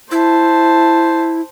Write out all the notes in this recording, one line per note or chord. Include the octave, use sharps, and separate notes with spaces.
E4 C5 A5